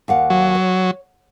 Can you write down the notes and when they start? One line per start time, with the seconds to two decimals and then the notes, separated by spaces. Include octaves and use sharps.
0.08 D#2 F5 F#5
0.30 F#3
0.55 C#5